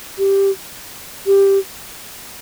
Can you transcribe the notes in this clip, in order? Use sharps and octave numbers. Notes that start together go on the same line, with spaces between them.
G4
G4